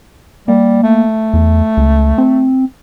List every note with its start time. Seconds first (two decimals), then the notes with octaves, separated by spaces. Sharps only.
0.48 G3 A#3
0.83 A3
1.33 E2
1.77 C#2
2.18 C4